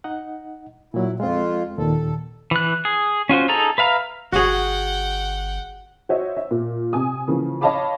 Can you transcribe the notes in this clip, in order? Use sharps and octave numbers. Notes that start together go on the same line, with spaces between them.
D#4 D#5 F#5
A#2 F#3 E4
F2 G#3 C4 F4
D#2 A#2 D#3 A4
E3 F#6
G#4
C#4 F4 F#4 C5
D#4 G#4 A4 A#5
B4 E5 F5 A#5
G1 F#4 G#4 F#5 G5
F#4 C5 C#5 D#5 E5
E5
A#2
C3 G#5 D#6
C#3 E3 F3 A#3
C#5 D#5 F5 A5 B5 D6